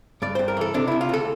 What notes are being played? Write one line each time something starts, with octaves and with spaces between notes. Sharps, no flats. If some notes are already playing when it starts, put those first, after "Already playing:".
G2 D5
G2 C5
A#4
E3 A4
C3 D4
C3 E4
F4
D2 A4